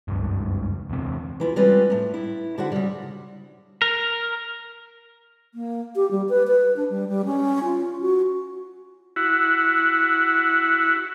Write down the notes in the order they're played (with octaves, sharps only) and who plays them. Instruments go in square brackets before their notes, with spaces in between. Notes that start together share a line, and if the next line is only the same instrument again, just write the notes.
[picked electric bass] F#1 C#2 G2
E2 C3
[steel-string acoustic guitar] E3 E4 F4
G3 G#3 C4 C#4 F4 B4
A2 A3
E4
D3 E4 F#4 C5 E5 F#5
C#3 G3
[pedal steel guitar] A#4
[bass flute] A#3
G4
G3
B4
B4
D4
G3
G3
C#4
F4
F#4
[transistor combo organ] E4 F#4